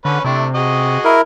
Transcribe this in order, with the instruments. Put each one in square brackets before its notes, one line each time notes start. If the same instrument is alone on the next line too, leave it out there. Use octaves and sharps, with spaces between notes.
[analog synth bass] D3 [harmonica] C#4 B4
[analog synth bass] C3 [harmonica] A3 D4 E4
[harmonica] F#4 G#4 D#5
[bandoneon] E4 A#4